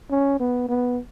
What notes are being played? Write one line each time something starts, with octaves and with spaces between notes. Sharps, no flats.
C#4
B3
B3